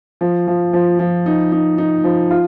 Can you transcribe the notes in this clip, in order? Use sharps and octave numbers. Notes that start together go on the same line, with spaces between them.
F3
F3
F3
F3
D#4
D#4
D#4
F3
F4